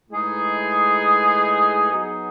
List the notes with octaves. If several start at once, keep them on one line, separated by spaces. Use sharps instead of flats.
A2 G#3 D#4 G#4 B4
F#3 B3 D#4 G#4